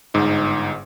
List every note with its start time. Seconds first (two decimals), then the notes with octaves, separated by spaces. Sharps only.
0.14 G1 G#2 D#4